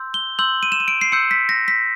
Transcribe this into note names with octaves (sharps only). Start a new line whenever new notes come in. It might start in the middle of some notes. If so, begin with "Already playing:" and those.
Already playing: C6 E6 G6
G7
C6 E6 G6 F#7
D#7
E7
D#7
D7
C7
C6 E6 G6 C#7
B6
A#6
B6